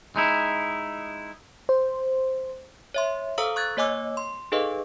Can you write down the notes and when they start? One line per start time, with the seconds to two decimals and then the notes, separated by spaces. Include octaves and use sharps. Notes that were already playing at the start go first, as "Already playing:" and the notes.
0.16 G#3 D#4 E4
1.69 C5
2.94 C#5 E5 C6
3.38 A4 C5 F5 A#5 D#6 E6
3.56 C#6 F#6 G#6 A6
3.77 A#3 C#5 D#5 G#5 D6 E6
4.17 C6
4.52 D#4 G#4 A4 B4 D#5 F5